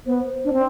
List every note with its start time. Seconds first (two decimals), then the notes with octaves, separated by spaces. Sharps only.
0.06 B3 C5
0.13 B4
0.20 C5
0.45 D4
0.53 C4